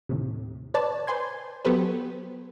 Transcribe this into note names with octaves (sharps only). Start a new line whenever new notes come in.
D#2 A2 C3
B4 C#5 D5 A5
B4 C5 G#5 C6 G#6
F#3 B3 G4 A4 B4 C5